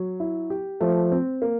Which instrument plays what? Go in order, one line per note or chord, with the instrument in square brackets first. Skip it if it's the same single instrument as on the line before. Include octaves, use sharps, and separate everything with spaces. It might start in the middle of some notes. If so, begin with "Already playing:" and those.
Already playing: [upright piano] F#3
E4
G4
[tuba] F3 [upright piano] A3
[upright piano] C4
A#3